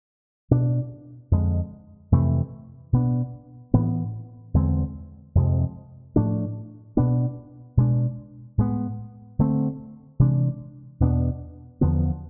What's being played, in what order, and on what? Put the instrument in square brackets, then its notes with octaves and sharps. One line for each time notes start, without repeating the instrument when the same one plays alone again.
[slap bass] B2 B3 D4
F2 D3 G#3
F2 C3 E3 A3
B2 B3 D4
A2 E3 B3
E2 D3 G#3 C4
F2 C3 F3 G#3
A2 F3 A3 D4
B2 B3 D4
B2 G#3 D4
A2 G#3 B3
D3 A3 C4
C3 E3 G#3 D4
E2 B2 B3 D4
E2 D3 F3 B3